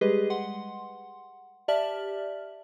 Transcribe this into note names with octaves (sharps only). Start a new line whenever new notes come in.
G3 G#3 G4 G#4 B4 D#5
F#5 C6
G4 D5 E5 A5 F6 F#7